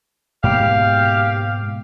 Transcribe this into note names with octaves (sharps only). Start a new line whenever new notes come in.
G#2 B2 A#3 G4 F5